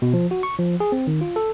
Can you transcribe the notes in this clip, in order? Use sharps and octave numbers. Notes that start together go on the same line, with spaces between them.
B2
F3
F#4
C#6
F3
G#4
C4
D#3
F4
A4